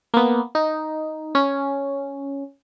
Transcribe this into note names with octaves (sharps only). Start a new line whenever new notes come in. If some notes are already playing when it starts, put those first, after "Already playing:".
A#3 B3
D#4
C#4